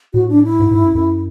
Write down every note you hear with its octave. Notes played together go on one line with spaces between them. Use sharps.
A2 F#4
D4
E4
G#2
G#2
F#2
F#2